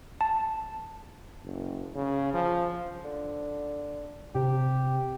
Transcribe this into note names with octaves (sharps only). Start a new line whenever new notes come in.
A5
F#1
C#3
F3
D3
C3 G4